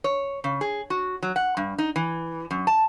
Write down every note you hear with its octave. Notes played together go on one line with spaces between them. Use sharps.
C#5
C#3
G#4
F#4
F#3
F#5
G2
D#4
E3
F#2
A5